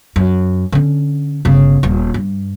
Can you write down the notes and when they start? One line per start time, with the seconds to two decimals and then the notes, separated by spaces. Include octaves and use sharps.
0.16 F#2
0.72 D3 C#4
1.45 G1 C#3
1.83 D#1
2.14 G2